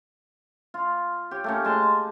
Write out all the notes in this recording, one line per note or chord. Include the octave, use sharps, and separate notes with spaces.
F4
G4 C#5
A3 A#3 C#4
G#3 A5 C6